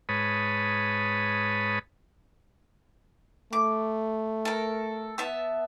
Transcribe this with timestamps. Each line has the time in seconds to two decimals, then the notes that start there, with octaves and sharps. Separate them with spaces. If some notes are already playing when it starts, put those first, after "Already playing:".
0.09 G#2 B4 C#5 A5 B5 D#6
3.53 A3 D6
4.45 A4 A#4
5.18 B3 E5 A5